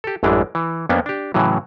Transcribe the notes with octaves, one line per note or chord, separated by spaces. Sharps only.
G4 A4
A1 F#2 E3 G#3 A3 D4
E3
F2 A#3 B3 C#4 D4
D4 G4
A2 C#3 E3 F#3